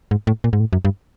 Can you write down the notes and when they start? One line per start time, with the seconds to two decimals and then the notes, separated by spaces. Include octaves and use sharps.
0.11 G#2
0.27 A2
0.44 A#2
0.53 G#2
0.60 A2
0.73 F#2
0.85 G2